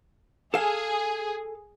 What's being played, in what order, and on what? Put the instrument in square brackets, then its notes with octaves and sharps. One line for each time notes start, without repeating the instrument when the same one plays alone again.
[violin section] G#4 [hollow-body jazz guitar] A4 F5